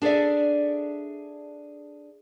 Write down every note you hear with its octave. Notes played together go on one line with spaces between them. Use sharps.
D4 G#4 A4 D5 E5